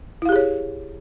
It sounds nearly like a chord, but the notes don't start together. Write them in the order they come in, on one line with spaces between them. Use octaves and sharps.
E4 F5 G4 G#4 C#5